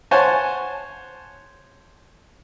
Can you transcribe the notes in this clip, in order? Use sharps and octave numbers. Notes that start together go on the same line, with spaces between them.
C5 C#5 F#5 G#5 A5